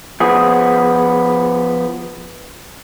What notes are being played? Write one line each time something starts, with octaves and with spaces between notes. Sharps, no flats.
F3 B3 G#4